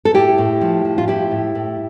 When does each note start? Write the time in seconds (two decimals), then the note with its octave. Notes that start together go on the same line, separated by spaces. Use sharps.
0.05 A4
0.14 A2 E4 G4
0.38 A2
0.61 F3
0.85 F3
0.98 F4
1.08 A2 E4 G4
1.31 A2
1.55 A2